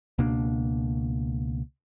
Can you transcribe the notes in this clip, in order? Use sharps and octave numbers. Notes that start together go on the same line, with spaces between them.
C#2 B2 A#3 D4